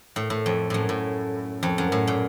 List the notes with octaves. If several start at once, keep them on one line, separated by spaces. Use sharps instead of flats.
A2
A2
F2
F#2 A2
A2
F2
F#2
A2
A#2